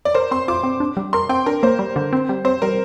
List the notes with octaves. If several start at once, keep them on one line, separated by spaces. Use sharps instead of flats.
D5
A#4 C5
C4 C6
F4 D6
C4
D4
G3
A#4 C6
C4 G5
D4 A#4
A#3 C5
G3
D3
C4
G3
C4 C5
G3 A#4